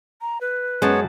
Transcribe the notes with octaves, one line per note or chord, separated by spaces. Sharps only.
A#5
B4
F#2 G#3 B3 C#5 A5